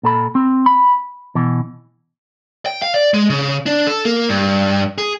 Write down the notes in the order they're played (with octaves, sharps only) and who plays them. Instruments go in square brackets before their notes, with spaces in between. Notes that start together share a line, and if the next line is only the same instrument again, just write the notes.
[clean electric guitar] A#2 A4 B5
C4
B5
B2 E3
[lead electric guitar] G5
F5
D5
G#3
C#3
D4
A4
A#3
G2
G#4